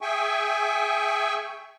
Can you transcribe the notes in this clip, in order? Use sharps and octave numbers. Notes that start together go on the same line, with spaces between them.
G#4 E5 G5 G#5 C#6